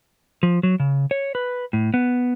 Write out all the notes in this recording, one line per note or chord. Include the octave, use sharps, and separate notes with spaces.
F3
F#3
C#3
C#5
B4
A2
B3